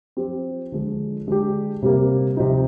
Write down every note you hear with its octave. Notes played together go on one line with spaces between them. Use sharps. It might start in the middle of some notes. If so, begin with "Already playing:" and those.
F3 C4 G4
D3 F3 G#3 D4
D3 G#3 D4 G4
C3 G3 A#3
C3 F3 C4 D#4